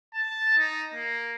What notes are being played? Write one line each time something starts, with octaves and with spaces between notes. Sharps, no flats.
A5
D#4
A#3